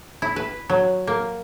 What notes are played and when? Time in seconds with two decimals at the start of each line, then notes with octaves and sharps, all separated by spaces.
0.22 E4
0.36 B4
0.69 F#3
1.07 A#3